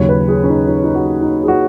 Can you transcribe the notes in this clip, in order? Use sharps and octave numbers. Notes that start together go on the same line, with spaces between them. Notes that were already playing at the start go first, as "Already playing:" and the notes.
Already playing: D#2 C#3 F#3 C#5
B4
G#4
C#4
D#4
D#4
D#4
F#4
D#4
G#4
F#4